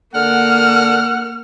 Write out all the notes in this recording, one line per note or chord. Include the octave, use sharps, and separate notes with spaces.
D3 A#3 F#5 F6